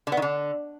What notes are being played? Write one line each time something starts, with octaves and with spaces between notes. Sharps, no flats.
D3
B3
D#3
D3